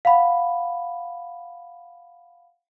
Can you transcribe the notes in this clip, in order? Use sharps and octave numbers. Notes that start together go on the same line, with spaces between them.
F5 F#5 B5